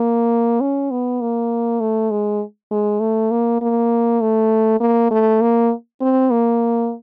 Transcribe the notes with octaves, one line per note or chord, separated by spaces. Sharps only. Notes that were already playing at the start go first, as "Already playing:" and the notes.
Already playing: A#3
C#4
B3
A#3
A3
G#3
G#3
A3
A#3
A#3
A3
A#3
A3
A#3
C4
A#3